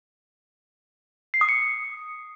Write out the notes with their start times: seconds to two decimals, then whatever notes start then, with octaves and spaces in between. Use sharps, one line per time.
1.34 C7
1.41 D#6
1.49 C#7